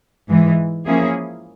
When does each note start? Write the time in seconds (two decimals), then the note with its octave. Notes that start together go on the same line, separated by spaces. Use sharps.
0.29 G#2 E3 G#3
0.86 F3 A#3 C#4 E4 G#4